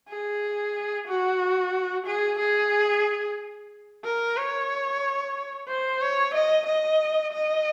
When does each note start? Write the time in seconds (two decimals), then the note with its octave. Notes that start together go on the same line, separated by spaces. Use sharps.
0.09 G#4
1.08 F#4
2.07 G#4
2.39 G#4
4.04 A#4
4.37 C#5
5.68 C5
6.01 C#5
6.34 D#5
6.67 D#5
7.33 D#5